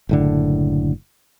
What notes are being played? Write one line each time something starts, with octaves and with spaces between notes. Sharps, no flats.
F#1 A2 D3